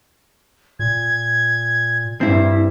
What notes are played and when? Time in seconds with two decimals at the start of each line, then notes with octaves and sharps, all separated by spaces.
0.79 A#2 G#6
2.21 G2 C4 E4